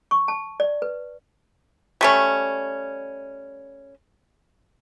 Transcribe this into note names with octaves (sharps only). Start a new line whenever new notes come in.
C#6
A5
D5
B4
G3 A3 C#4